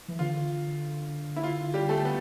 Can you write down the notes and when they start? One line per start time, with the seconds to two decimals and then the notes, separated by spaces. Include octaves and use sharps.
0.08 E3
0.19 D3 F4
1.36 E4
1.43 F4
1.74 G3 G4
1.89 A3 A4
2.05 B3